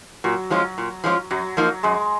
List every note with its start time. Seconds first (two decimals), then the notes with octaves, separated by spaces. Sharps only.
0.24 A#2 F#3
0.50 F3 G#3 C#4 F4
0.78 A#2
1.04 F3 G#3 C#4 F4
1.31 F#2 F#3
1.57 F3 A#3 D#4
1.83 F#2 G#3